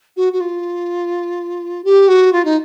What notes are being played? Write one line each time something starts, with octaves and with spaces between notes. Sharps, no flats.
F#4
F#4
F4
G4
F#4
F4
D#4